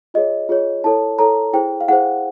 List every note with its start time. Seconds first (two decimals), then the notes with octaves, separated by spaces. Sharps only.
0.14 F4 G#4 C#5 D#5
0.49 F4 G#4 C#5
0.84 E4 A4 C#5 A5
1.19 E4 A4 C#5 A#5
1.53 E4 G#4 C5 G5
1.81 F5
1.88 E4 G#4 C5 F#5